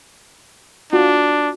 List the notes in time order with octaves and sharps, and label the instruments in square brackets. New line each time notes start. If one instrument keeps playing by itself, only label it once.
[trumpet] D4 [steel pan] F4 F#4